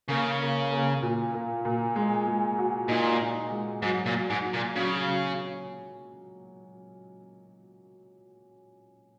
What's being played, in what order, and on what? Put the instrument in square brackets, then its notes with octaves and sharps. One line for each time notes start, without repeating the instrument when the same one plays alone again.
[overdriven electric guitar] C#3 [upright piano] A#3
[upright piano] A#3
A#3
A#2
A#3
A#2
G#3
G#3
F#4
[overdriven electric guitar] A#2 [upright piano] D#4
[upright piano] D#4
G#3
[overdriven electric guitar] G#2 [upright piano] F#3
[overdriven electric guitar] A#2
[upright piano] F#3
[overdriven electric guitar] G#2
[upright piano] F#3
[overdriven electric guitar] A#2
[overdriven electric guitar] C#3 [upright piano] F#3
[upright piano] F#3
C#4